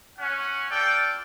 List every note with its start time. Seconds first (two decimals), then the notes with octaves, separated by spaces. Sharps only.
0.19 C#4 F#5
0.70 F4 A4 D5 G5